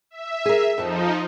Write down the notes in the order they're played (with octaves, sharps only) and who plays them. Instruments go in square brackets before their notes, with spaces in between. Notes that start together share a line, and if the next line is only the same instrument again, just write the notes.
[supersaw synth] E5
[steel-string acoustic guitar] G#4 A#4
[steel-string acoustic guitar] F2 A5 [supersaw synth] F3 D#4